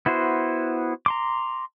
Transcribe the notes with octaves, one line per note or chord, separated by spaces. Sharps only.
B3 E4 F#4 C5
A#5 C6 D6